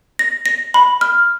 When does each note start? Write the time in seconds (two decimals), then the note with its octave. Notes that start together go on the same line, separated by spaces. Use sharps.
0.19 A#6
0.46 A#6
0.74 B5
1.01 F6